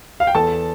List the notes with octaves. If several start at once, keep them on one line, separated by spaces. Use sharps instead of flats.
F5
G5
E2 A4 A5